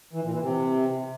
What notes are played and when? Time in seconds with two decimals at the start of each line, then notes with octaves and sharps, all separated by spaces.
0.13 E3
0.23 A#2
0.32 E3
0.42 C3